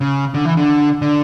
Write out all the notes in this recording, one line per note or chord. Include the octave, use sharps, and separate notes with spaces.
C#3
D3
E3
D3
D3